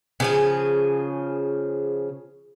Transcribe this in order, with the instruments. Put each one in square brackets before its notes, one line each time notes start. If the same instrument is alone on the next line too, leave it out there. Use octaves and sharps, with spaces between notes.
[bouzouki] C#3 F3 G#4